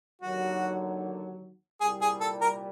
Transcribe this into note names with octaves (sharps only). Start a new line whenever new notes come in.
D#2 D3 F#3 F#4
C2 A#2 G3 G#4
G#4
A4
A#4